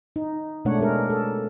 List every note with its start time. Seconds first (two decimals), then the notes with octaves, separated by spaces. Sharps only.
0.16 D#4
0.65 B2 G#3 A3 D4 C#5 F#5
0.79 G#3 D4 G#4 A#4
1.10 A4